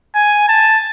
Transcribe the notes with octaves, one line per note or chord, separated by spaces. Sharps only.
G#5
A5